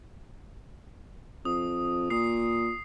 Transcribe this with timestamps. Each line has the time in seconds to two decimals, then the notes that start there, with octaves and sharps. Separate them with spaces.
1.45 F2 D#6
2.10 A#2 D#6 C7